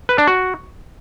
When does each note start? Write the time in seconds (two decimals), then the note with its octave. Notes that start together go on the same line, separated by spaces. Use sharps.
0.09 B4
0.18 D4
0.27 F#4